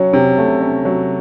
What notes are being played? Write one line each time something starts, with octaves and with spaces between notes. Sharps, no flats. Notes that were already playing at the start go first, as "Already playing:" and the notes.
Already playing: F#3 C#4
C3
A3
C#4
F#3